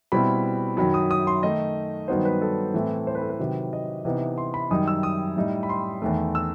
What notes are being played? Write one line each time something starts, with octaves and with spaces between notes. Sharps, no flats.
B2 G3 C4 E4 B5
F#2 D#3 F#3 B5
D#6
D#6
C6
D#3 A3 D#4 D#5
G2 D#3 F#3 B3 D#4 C5
B4
A4
A2 E3 A3 C4 E4
C5
B4
A4
B4
C3 D#3 F#3
D#5
C3 E3 B3 D#4
C6
B5
F#2 D#3 G3 D#4 D#6
E6
D#6
A2 G3 D#4
B5
C6
E2 D#3 A3
E6